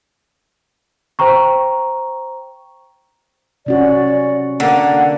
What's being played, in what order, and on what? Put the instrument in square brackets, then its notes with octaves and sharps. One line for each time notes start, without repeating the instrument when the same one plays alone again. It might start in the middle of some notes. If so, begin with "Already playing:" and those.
[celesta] C5 G5 A#5 C#6
[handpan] C3 C#4 F#4 [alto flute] D5
[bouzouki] D3 [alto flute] A#3 [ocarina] F#5